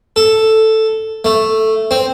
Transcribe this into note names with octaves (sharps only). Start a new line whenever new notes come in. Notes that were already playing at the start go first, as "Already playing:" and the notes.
A4
A3
C4